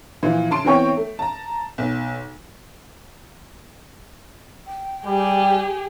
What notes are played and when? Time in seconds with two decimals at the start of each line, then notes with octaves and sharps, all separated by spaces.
0.23 A#2 E3 F3
0.51 C#3 A5 C6 D7
0.65 E3 B3 C4 C#5 G5 C#6
0.97 A3
1.19 A5 A#5
1.78 B1
4.67 G5
5.06 G3 G4 G#4